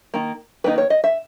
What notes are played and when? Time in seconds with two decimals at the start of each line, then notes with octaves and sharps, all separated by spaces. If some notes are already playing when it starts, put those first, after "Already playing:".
0.14 D#3 A#3
0.64 D#3 A#3 D#4 B4
0.78 C#5
0.90 D#5
1.04 E5